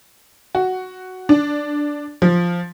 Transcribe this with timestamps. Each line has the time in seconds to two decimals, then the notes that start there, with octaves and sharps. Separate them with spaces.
0.55 F#4
1.29 D4
2.22 F3